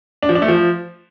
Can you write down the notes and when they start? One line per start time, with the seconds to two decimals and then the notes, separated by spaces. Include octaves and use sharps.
0.23 D4
0.29 F3
0.35 D4
0.42 A3
0.48 F3